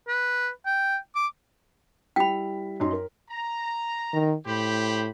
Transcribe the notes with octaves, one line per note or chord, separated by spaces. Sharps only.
B4
G5
D6
G3 E4 G5 B5 B6
F#2 D#4 C6
A#4
A#5
D#3
A2 G4 C5 B5